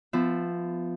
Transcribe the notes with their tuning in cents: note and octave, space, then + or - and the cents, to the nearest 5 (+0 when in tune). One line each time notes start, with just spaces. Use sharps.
F3 +0 B3 +30 E5 +0